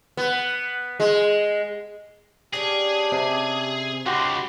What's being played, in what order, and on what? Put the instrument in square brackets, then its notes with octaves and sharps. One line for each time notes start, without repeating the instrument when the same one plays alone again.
[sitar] B3
G#3
[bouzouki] C#4 D4 [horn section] G4 [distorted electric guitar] G#4
[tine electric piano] C3
[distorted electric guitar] C#2 [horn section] G#2 B5 C6 [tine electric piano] F#4 G4